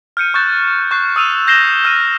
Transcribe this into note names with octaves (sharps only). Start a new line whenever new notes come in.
F6 G6 C#7 D#7
C#6 D#6 F#6 G6 A6 E7
C#6 F#6 C7
D#6 E6 D#7 F7
G6 A#6 C7 E7 G7
F6 G6 D#7 G7